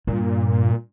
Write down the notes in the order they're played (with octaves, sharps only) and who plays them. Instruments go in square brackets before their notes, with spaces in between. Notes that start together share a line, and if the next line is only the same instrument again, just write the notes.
[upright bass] G2 [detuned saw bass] A#2